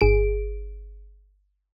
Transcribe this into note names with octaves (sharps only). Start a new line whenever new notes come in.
G1 G#4 D7